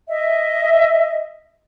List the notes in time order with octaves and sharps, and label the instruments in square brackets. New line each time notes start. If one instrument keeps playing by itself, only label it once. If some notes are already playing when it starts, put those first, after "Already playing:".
[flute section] D#5 E5